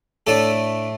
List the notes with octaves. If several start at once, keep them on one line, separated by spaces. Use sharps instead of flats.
A2 A3 D4 A4